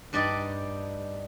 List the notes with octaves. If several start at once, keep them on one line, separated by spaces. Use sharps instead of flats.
G2 G3 D#4 D5 D#5